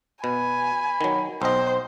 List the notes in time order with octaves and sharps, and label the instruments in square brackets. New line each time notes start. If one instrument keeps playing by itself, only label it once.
[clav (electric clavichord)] B2 [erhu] G#5 [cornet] B5
[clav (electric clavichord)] D#3 F#3
[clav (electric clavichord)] B1 D#5 [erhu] C5 [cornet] G5